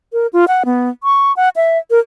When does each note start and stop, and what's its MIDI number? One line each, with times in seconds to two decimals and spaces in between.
0.13 0.27 70
0.33 0.45 65
0.48 0.63 78
0.65 0.89 59
1.03 1.35 85
1.37 1.49 78
1.56 1.78 76
1.91 1.99 70